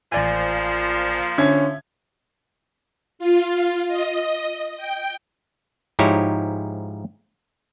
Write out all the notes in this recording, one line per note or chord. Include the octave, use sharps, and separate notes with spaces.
A1 A#2 F3 D5 G#5
D3 C#4 E5 G#6
F4
D#5
G5
G#2 F3 D#4 E4 G4 C#5